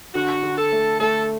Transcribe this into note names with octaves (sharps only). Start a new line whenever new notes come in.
D3 F#4
D3
A4
A3
A3 A4